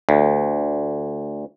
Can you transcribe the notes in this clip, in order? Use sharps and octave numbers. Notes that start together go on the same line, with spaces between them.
D2